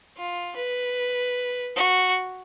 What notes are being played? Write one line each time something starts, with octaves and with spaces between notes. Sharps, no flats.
F4
B4
F#4